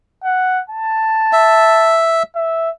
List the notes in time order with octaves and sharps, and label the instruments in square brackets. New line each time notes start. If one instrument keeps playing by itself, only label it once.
[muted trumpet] F#5
A5
[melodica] E5
[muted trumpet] E5